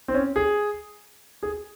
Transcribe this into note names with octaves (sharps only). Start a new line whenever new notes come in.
C4
C#4
G#4
G#4